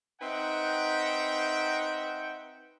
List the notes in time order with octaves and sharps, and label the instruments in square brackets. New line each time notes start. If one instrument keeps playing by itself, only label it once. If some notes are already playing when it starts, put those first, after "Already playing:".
[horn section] C4 D#4 B4 E5 F#5 G5